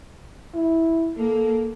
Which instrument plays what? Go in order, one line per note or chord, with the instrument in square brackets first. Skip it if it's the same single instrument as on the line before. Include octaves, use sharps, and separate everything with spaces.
[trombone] E4
[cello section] A#3 [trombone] A4